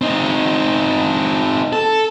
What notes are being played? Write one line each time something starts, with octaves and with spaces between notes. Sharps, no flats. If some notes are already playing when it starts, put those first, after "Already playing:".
C4 D#4
A4